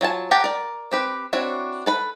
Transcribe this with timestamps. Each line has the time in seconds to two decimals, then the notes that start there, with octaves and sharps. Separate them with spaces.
0.01 F#3 F4 G#5 A5
0.31 G4 A#4 F#5 G5 A5
0.44 A#4 D5
0.92 C4 G4 B4
1.33 C4 D4 E4 F#4 C#5
1.86 A4 B4 B5